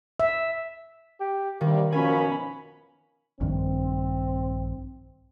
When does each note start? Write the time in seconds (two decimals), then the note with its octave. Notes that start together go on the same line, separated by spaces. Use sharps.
0.20 E5
1.20 G4
1.61 G2 C3 D#3 G3 A#3
1.92 F#2 B2 F3 A#3 C#4 G#5 B5
3.41 A#1 G2 D#3 C4